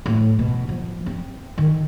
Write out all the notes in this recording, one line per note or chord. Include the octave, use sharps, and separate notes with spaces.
A2
B2
F3
C4
D#3